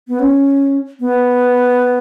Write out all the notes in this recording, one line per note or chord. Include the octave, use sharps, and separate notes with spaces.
B3
C#4
B3